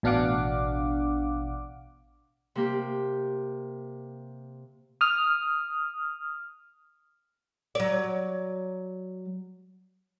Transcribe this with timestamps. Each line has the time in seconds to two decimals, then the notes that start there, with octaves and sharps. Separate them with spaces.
0.03 A1 B2 D4 F5 F#5 D6
2.55 C3 A#3 G4
5.01 D#6 F6
7.75 F#3 D5